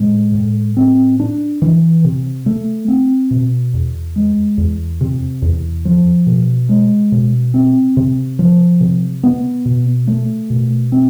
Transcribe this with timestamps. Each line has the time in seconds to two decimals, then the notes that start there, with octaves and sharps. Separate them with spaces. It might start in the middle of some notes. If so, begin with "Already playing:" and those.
Already playing: A2 G#3
0.35 A2
0.77 C4
1.20 D4
1.62 E3
2.04 C3
2.46 A3
2.88 C4
3.31 B2
3.74 E2
4.16 G#3
4.58 E2
5.01 C3
5.42 E2
5.85 F3
6.26 B2
6.69 G#3
7.12 B2
7.54 C4
7.97 C3
8.39 F3
8.80 C3
9.23 B3
9.65 B2
10.07 A3
10.50 B2
10.92 C4